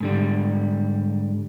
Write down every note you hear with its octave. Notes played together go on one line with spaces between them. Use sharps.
G#2 D3 G3